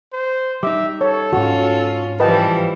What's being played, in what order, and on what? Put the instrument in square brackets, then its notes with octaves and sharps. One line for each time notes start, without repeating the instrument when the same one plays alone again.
[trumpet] C5
[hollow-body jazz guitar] G3 D#4 [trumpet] E5 [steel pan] D6
[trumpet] A4 [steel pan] C#5
[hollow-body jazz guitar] D#2 G#2 [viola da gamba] C#4 F4 [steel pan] F#4
[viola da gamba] E3 F3 G3 [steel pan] B4 D#5 G5 [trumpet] A5